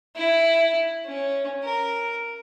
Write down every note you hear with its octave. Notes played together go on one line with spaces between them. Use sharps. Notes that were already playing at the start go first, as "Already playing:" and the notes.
E4
C#4
A#4